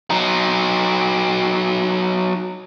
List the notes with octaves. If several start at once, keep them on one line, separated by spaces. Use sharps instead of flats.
F#3 D#4